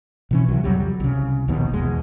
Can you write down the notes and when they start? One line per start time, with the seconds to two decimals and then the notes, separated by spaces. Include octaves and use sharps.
0.31 B2 E3 C#4
0.48 C2 F#3
0.64 F2 C#3 F#3 G3
1.00 C2 C#3
1.48 A#1 D#2 B2 D#3
1.73 E2 B2 G#3